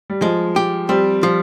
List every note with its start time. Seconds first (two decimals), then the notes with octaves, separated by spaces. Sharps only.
0.10 G3
0.22 F3 G#3
0.56 G4
0.89 G3 C4
1.23 F3